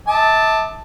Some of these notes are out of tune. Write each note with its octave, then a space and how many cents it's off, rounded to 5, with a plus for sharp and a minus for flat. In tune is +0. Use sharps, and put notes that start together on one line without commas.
E5 -35 A5 +5 D6 +20